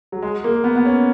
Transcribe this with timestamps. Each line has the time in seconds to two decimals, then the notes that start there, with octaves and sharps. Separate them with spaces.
0.12 F#3
0.22 G#3
0.44 A#3
0.64 B3
0.76 B3
0.85 C#4